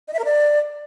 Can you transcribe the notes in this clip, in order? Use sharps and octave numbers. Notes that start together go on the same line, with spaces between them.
D#5
E5
A#4
D5